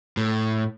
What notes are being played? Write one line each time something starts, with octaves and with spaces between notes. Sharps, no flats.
A2